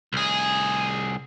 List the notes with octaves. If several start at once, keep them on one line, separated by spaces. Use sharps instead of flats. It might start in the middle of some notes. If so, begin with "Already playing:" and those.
C2 G#4